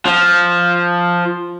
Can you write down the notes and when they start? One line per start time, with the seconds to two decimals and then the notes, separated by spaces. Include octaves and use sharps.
0.06 F3